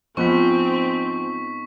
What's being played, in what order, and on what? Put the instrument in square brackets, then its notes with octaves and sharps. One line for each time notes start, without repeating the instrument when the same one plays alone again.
[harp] G#2 B3 [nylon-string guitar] F3 [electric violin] C4 [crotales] C#6 B6